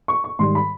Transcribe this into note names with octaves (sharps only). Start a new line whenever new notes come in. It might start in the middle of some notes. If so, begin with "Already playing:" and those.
C#6
C#6
G#2 D#3 G3 C6
B5